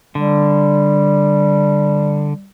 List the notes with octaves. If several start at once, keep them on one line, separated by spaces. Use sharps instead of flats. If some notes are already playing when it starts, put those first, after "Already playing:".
D3 G3